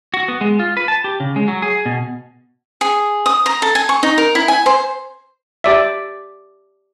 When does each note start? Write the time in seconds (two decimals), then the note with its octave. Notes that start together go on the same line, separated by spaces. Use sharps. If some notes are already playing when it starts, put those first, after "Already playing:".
0.14 F#4
0.28 B3
0.41 G#3
0.59 F4
0.77 B4
0.88 A5
1.04 G4
1.20 C#3
1.36 G#3
1.48 F#3
1.62 G#4
1.86 B2
2.81 G#4
3.26 D#6
3.46 A#5
3.62 A4
3.75 G#5
3.89 C#6
4.03 D#4
4.18 A#4
4.35 E4
4.48 G#5
4.66 C5
5.64 G4 D5 E5